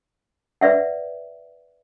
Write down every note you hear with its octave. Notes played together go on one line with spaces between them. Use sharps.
B4 D5 E5 F#5